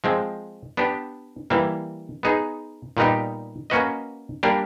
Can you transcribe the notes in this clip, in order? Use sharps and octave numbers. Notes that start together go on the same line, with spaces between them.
F3 G#3 C4
B3 D4 G4
E3 G3 A#3
B3 D#4 G#4
A#2 G3 B3 D#4 G4
A#3 C#4 F#4 B4 D#5
G3 A#3 D4 G4 A#4